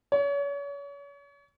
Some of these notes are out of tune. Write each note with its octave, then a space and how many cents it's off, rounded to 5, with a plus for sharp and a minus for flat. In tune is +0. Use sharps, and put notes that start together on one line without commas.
C#5 +35